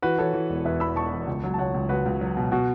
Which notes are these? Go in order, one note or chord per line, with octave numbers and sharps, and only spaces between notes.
E3 F#4 B4
E3 A4 C#5
E3
E1
E2 B4 E5
E2 B5 E6
E1 A5 C#6
E2
C#2
F#3
A5
C#2 C#5 F#5
C#2
C#2 F#4 B4
C#2
F#3
B2
B2 F#4